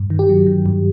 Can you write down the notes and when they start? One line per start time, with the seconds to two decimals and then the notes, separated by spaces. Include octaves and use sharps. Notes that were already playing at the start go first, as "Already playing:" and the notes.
Already playing: G2
0.10 D#3
0.19 G4
0.29 F#3
0.47 D#3
0.66 G2